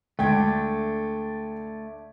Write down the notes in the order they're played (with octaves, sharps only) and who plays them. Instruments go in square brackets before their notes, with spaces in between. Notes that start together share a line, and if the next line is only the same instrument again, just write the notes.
[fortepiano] D2 [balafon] G#3 [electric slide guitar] A3 D4 [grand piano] G5 G#6